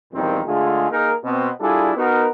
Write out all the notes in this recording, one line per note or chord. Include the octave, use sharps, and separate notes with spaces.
E2 A#2 D#3 F3 G3 C4
D3 G#3 A3 F4 G#4
A#3 D#4 G#4 A#4
B2 C4
G3 D4 E4 F4 G#4 A4
B3 D#4 F#4 A#4